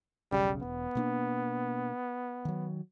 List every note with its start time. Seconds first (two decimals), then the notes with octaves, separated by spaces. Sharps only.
0.32 E1 B1 C#3 G3
0.62 E1 B3
0.95 B2 A#3 D4
2.45 D#3 F#3